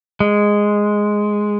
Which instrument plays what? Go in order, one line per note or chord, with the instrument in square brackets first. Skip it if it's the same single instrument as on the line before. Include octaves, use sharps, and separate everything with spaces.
[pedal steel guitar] G#3